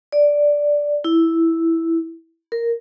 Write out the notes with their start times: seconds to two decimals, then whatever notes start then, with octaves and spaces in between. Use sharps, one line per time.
0.12 D5
1.04 E4
2.52 A#4